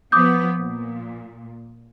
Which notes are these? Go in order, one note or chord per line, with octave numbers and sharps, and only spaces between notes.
F3 B3 D6 D#6 G6
A#2